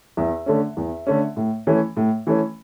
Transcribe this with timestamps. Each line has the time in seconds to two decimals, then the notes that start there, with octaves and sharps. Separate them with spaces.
0.17 E2 E5
0.46 D3 A3 C#4
0.77 E2
1.07 D3 A3 C#4
1.37 A2
1.67 E3 A3 C#4
1.97 A2
2.27 E3 A3 C#4